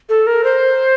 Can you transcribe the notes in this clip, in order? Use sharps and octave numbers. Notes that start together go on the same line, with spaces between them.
A4
A#4
C5